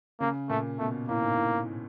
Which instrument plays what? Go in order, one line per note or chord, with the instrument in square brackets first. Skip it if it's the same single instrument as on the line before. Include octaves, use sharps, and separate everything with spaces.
[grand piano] C#3 [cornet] A#3
[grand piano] A#2 [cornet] A3
[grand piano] B2 [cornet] A3
[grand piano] A2 [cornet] A#3
[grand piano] G#2
A2